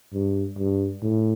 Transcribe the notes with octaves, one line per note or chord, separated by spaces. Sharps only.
G2
G2
A2